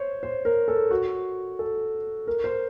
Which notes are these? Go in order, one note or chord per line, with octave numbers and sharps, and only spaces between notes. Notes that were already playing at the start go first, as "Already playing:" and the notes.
Already playing: C5 C#5
C5
A#4
A4
F#4
A4
A#4
C5